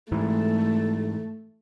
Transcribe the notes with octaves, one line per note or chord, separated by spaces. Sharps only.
G#2 E3 A3